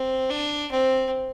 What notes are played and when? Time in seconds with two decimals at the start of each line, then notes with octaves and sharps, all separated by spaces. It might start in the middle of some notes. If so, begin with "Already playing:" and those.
Already playing: C4
0.30 D4
0.71 C4